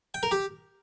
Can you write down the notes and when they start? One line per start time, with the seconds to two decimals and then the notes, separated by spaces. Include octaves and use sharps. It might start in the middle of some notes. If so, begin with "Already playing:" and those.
0.14 G5
0.23 A#4
0.31 G4